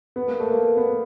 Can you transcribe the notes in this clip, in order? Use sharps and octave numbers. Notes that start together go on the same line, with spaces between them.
B3
A#3
A3
A#3
B3